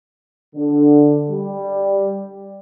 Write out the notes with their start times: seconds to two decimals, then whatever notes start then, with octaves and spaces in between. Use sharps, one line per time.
0.55 D3
1.30 G3